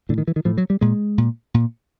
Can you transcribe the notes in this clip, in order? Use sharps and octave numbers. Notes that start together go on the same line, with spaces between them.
A2 D3
D#3
E3
D#3
A2 F3
F#3
G3
A#2 G#3
A#2
A#2